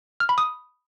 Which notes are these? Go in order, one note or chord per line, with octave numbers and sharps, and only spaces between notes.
F6
B5
D#6